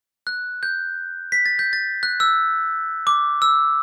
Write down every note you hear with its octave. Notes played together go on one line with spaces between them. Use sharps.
F#6
G6
B6
A6
G6
A6
F#6
E6
D6
E6